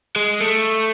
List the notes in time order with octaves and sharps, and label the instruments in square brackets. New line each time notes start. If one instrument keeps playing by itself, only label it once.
[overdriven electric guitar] G#3
A3